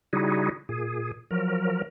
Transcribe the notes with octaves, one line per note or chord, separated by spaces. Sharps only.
C#3 G3 D#4 E4 F#4 G#4
A#2 G#4
F3 F#3 A#4